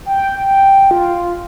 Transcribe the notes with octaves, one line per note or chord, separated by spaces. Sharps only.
G5
F4